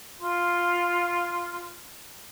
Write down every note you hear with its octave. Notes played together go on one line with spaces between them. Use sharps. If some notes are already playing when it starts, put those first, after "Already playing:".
F4 C6